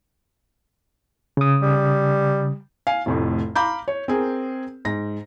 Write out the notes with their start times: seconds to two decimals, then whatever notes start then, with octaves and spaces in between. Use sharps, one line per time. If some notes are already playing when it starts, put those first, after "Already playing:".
1.37 C#3 D#6
1.62 G3
2.87 F5 G#5
3.06 F1 F2 A2
3.56 F5 A#5 B5 D6 G6
3.88 C#5
4.08 C4 G#4 A#4
4.85 G#2 A#6